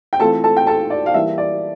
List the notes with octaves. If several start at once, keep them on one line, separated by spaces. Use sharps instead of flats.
G5
E3 A3 C4 F4 A4 A5
A4 A5
G5
A4 A5
D5
F5
E3 G3 A#3 E5
D5